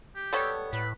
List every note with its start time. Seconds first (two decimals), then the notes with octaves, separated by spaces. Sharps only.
0.16 G4
0.33 G3 B3 A4 C#5
0.73 A2 B4